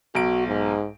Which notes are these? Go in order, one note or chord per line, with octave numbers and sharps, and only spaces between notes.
B1 F#4 D7
G#2